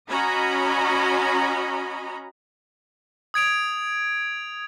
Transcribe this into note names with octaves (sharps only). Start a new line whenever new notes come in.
C#4 F#4 D#5 G#5 A#5 B5
D#6 G#6 D7 F7